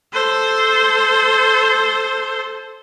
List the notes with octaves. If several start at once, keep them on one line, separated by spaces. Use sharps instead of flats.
A4 C5